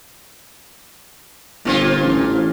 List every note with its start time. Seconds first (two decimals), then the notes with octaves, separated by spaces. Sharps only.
1.65 G1 A#2 C4 F4
2.03 A1